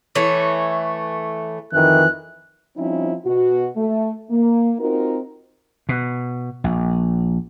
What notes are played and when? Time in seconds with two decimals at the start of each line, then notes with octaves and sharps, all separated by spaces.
0.15 E3 A3 C#5
1.73 F2 D#3 E3 F#6
2.77 F3 G3 C4 C#4 D#4 E4
3.26 B2 F#4
3.77 A3
4.31 A#3
4.80 C4 D#4 F4 F#4 A#4
5.89 B2
6.64 A#1